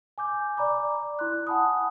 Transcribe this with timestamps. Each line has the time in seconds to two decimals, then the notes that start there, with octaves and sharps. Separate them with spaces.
0.18 G#5 D6 G6
0.57 D5 A#5 B5 D6
1.19 E4 C6 F#6
1.47 F#5 G#5 A5 B5 D#6